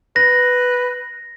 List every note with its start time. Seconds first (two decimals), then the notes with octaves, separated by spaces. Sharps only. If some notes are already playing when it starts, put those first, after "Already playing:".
0.16 B4 A#6